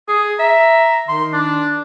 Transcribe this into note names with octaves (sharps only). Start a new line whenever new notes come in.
G#4 D#6
E5 A#5
D#3 C6
D4